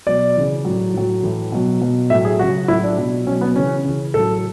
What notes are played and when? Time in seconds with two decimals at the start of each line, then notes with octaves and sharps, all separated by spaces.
0.07 B2 F#3 D5
0.36 C#3 E3
0.65 A2 F#3
0.94 A2 F#3
1.23 A2 E3
1.52 B2 F#3
1.81 B2 F#3
2.10 A2 F#3 E5
2.25 G#4
2.39 C#3 F#3 F#4
2.68 A2 F#3 E4
2.83 D4
2.98 B2 F#3
3.27 B2 C#4
3.31 F#3
3.41 B3
3.56 C#3 E3 C#4
3.85 C#3 E3
4.14 A2 F#3 A4